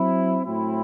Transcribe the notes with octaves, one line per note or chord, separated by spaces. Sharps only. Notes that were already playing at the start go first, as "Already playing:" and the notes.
Already playing: F#3 C4 E4
A2 F#3 C4 E4